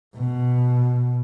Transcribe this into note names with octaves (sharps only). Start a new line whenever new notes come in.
B2